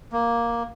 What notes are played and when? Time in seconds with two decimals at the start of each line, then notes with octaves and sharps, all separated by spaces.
0.12 A#3